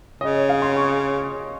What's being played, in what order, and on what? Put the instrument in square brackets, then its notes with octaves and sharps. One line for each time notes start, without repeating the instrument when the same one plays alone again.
[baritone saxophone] C#3 [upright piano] D#5
[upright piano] C#5
F5
C6
C#6